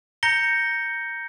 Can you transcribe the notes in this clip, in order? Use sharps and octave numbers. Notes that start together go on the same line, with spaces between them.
A#5 G6 A#6 C#7 G7